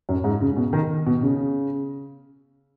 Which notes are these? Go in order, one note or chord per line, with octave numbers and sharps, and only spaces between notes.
F#2
G#2
C#3
B2
D#3
B2
C#3